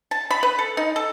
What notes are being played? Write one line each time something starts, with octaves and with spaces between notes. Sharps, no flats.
A5
B5
B4
A4
D#4
A4